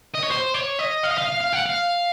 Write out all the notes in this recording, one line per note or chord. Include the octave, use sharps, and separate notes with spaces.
D#5
C#5
C5
C#5
D#5
F5
D#5
F5
F5
F5
F#5
F5